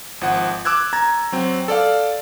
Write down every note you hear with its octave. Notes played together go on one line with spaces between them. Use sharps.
G#1 F3 F#5
D6 E6 F#6 G#6
A#5 G#6 A6
F#3 C4
A4 D5 F5